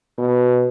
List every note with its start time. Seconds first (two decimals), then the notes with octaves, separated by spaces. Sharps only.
0.19 B2